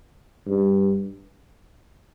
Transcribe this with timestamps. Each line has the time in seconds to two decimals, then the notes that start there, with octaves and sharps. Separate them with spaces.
0.47 G2